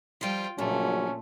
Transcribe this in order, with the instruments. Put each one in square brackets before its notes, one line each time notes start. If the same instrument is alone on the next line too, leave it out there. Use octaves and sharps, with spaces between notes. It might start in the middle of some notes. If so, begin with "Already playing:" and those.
[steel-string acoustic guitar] F3 G3 [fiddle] F4 G5
[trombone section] A#1 C#3 F#3 [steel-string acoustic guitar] A#2 [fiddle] A3 [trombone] C#4